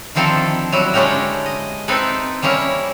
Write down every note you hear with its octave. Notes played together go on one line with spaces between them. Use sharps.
D3 D#3 F3 C4 E4 A4
F#3 G3 E4 F#4
D3 G#3 A3 C#4 G4 A#4
D#5
C4 D#4 E4 A4 B4
G3 A#3 C#4 E4 A#4